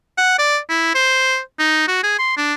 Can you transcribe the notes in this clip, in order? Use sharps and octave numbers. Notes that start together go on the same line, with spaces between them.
F#5
D5
E4
C5
D#4
F#4
G#4
C6
D4